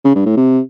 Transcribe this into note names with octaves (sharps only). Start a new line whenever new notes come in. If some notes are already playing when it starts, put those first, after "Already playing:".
C#3
G2
A2
C3